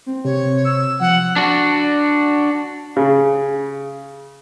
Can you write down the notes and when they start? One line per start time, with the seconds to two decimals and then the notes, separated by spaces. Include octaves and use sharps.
0.06 C4
0.25 C3 C#5
0.65 E6
1.00 F3 F#5
1.36 D4 F#4
2.97 C#3